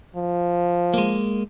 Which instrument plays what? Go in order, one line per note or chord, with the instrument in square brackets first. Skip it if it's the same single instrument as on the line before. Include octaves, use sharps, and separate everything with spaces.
[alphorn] F3
[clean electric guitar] G#3 A#3